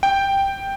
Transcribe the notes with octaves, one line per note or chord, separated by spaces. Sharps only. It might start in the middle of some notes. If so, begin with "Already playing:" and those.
G5